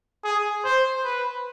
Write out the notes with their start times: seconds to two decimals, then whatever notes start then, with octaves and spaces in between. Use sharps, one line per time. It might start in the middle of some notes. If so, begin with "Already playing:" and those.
0.24 G#4
0.64 C5
1.04 B4